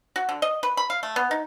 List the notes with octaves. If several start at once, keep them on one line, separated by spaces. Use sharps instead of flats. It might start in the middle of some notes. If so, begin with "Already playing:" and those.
F#4
D3
D#5
B4
B5
F5
A3
B3
D#4